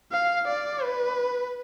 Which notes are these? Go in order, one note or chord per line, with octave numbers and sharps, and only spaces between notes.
F5
D5
B4